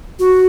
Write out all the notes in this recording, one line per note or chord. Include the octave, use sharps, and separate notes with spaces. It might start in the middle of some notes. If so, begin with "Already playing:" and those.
F#4